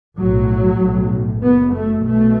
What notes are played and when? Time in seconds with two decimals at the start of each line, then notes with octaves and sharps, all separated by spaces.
0.18 B1 A2 F#3
0.80 B1 A2
1.43 F#1 F#2 B3
1.74 A3
2.05 B1 B2 A3